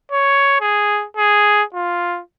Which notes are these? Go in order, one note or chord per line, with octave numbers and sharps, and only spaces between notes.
C#5
G#4
G#4
F4